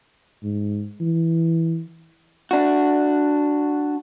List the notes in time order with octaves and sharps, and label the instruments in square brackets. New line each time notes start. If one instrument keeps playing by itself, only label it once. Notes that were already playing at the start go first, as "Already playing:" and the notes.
[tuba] G#2
E3
[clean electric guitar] D4 F#4